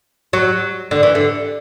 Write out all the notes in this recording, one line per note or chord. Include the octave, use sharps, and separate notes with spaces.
F#3
D3
E3
D3